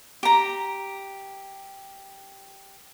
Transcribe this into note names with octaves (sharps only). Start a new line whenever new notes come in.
G4 A#5